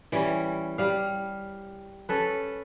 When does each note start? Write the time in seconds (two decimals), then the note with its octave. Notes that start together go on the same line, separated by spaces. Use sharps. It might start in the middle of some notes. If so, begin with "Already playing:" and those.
0.12 E3 G3 C#4
0.78 G3 F5
2.09 C#4 A4 B4